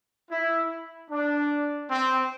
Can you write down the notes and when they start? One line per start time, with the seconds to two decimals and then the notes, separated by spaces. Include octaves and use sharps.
0.31 E4
1.10 D4
1.89 C4